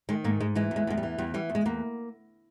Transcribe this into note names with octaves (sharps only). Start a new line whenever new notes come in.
D#3 G#3
G#2 A#3
G#2 G#3
E3 G#3
E2
G#3
E2 G#3
G3
E3
E2 G3
E3 G3
E2
G#3
E2 A#3